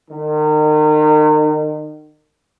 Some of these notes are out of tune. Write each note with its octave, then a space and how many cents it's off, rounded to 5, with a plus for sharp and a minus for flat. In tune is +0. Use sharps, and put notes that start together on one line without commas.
D#3 -35